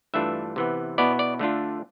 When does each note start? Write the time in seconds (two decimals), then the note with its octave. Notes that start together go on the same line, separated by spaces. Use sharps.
0.14 G2 E3 A3 D4 F4 E5
0.56 C3 E3 B3
0.98 B2 B3 E4 D5
1.19 D5
1.39 D3 A3 D4 F4